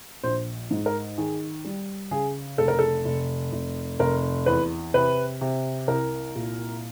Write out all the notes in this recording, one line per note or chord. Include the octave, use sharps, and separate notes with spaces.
A#1 C5
G#2
A#4
D#3 G#4
G3
C#3 G#4
F1 A4
A#4
A4
F1
F1
F1 A#4
E2 B4
C3 B4
C3
C2 A#4
A#2